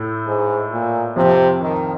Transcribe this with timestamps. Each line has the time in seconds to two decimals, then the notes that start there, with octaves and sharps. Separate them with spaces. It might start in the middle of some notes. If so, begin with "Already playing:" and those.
Already playing: A2 A3
0.26 G#2
0.71 A#2
1.16 F2 C3 F3
1.61 D#3